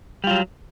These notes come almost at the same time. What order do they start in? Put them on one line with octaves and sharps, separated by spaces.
G3 F4 F#3